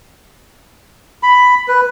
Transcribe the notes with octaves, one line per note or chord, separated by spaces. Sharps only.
B5
B4